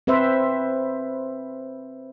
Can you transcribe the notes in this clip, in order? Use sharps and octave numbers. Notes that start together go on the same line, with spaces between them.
C4 B4 C5 E5